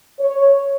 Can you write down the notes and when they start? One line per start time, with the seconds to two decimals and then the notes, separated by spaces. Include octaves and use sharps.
0.20 C#5